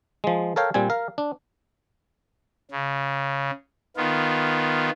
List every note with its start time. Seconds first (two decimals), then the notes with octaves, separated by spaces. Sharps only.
0.24 F3 G#3
0.56 A4 A#4 C#5 F5 G5
0.74 A#2 G3 C4 G#5
0.90 A#4 F5
1.18 D4
2.71 C#3
3.97 D#3 B3 F4